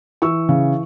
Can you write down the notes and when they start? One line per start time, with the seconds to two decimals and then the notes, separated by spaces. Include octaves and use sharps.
0.22 E3 C#6 E6
0.49 C#3